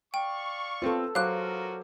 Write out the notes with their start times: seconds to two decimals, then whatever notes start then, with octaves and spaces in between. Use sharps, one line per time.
0.14 D5 F5 G5 C#6
0.82 C4 F4 A4 B4
1.15 F#3 F4 F#4 A#4 C5 F5 D6 F#6